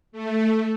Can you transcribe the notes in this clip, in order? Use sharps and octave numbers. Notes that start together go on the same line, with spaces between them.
A3